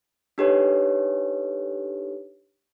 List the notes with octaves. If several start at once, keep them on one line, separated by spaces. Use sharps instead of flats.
D4 D#4 G4 A4 B4 C#5